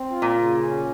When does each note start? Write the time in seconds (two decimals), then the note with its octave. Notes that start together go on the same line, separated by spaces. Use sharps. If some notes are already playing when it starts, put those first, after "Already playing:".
Already playing: C4
0.10 F4
0.22 A#2
0.35 C#3
0.59 C#4